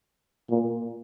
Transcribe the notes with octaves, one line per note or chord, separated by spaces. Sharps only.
A#2